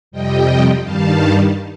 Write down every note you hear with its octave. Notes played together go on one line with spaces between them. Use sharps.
F2 C3 G3 D#5 G5
G2 D#3 G3 F5 A5